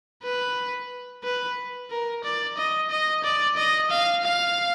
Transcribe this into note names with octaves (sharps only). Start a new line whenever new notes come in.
B4
B4
A#4
D5
D#5
D#5
D5
D#5
F5
F5